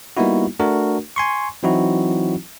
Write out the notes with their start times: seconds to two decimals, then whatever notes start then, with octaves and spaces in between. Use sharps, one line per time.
0.17 G3 A#3 B3 D#4 E4 F#4
0.59 A3 D4 F#4 A#4
1.16 G#5 C6 C#6
1.63 E3 F#3 C4 D#4 E4 F#4